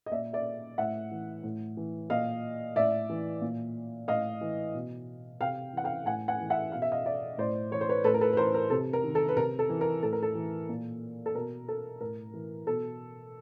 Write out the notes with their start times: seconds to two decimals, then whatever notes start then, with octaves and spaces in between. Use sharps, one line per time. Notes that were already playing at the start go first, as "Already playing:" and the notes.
0.06 D#5
0.12 A#2 D5 E5
0.33 D5 E5
0.78 A2 E5 F#5
1.11 E3
1.44 A2
1.77 E3
2.10 A#2 D#5 F5
2.76 A2 D5 E5
3.10 E3
3.42 A#2
4.08 A2 D#5 F5
4.41 E3
4.74 B2
5.41 C3 F5 G5
5.73 E3 F#5
5.84 F5 G5
6.06 A2 F#5 G#5
6.28 F#5 G#5
6.40 E3
6.50 E5 F#5
6.72 B2 F5
6.82 E5
6.92 D#5 F5
7.06 D5 E5
7.38 A2 C5 D5
7.71 E3 C#5
7.81 C5
7.89 B4 C#5
8.04 A2 A4 B4
8.14 A#4
8.21 A4 B4
8.33 B4
8.37 E3 A#4 C5
8.54 A#4
8.70 C3 A4
8.93 A#4
9.04 D#3
9.15 A4
9.29 B4
9.37 C3 A#4
9.59 A4
9.70 E3
9.81 A#4
10.03 A2 A4
10.13 A#4
10.23 A4
10.35 E3
10.69 A#2
11.26 A4
11.35 B2 A#4
11.68 A4
12.01 A2 A#4
12.34 E3
12.67 B2 A4